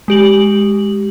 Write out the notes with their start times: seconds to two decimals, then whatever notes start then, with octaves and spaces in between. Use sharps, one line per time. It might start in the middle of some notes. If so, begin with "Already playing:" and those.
0.08 G#3 G4 F#7